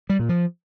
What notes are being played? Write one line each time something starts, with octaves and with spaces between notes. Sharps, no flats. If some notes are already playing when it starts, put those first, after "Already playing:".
G3
A#2
F3